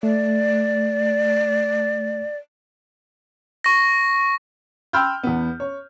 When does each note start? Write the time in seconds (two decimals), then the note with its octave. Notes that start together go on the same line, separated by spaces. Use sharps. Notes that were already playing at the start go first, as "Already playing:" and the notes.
0.03 A3 D5
3.64 C#6 A#6
4.93 G5 B5 C6 E6 F6 G6
5.23 E2 B3
5.60 C#5